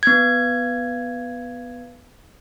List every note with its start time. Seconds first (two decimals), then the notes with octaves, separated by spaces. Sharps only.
0.03 B3 G#6